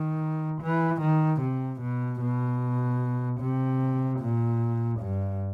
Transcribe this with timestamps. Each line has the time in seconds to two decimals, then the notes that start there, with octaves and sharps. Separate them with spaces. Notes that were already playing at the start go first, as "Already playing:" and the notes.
Already playing: D#3
0.62 E3
1.01 D#3
1.41 C3
1.81 B2
2.21 B2
3.41 C3
4.20 A#2
5.01 G2